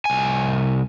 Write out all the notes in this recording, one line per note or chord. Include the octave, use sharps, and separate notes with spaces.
C2 G#5